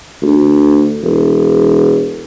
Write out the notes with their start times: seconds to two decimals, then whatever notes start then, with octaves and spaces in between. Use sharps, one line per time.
0.22 D2
1.02 E1